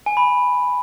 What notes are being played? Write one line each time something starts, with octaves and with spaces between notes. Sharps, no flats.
G#5
B5